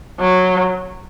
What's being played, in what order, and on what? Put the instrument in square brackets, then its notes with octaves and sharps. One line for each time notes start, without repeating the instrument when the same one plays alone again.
[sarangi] F#3